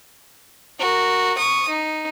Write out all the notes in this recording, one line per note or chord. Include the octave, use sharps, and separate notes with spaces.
F#4 A#4
C#6 D#6
D#4